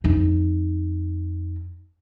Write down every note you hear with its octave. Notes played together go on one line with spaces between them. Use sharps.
F2 D#4